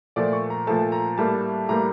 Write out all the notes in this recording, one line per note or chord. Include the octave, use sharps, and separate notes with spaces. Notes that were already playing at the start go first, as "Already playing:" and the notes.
A#2 F3 A3 D5
C#6
A#5
A#2 F3 A3 A5
A#5
A2 G3 A#3 A5
A2 G3 A#3 A#5